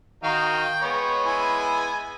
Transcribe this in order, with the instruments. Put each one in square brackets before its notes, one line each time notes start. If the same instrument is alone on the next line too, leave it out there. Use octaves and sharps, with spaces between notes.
[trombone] D#3 [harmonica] D#4 F#4 F5 [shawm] G5
[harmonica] G#3 B3 [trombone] C#5
[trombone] E4 [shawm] G#5